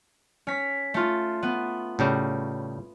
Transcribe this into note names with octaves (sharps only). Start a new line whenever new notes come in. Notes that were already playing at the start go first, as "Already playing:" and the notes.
C#4 B6
A3 F4
B3
A2 C#3 G3